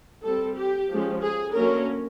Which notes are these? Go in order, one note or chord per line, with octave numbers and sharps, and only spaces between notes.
G3 C4 A4
G4
F3 G#3 C#4
G#4
D3 F#3 A#3 C#4 A#4